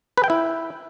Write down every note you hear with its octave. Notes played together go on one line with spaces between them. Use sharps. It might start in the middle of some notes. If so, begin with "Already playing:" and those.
B4
G5
E4